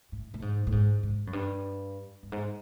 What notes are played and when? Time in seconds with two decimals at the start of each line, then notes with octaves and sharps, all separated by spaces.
0.12 A2
0.34 A2
0.42 G#2
0.67 A2
0.72 G#2
1.03 G#2
1.27 F#2
1.33 G2
2.23 G2
2.32 G#2